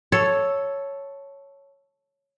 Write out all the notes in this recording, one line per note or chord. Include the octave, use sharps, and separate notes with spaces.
A4 C#5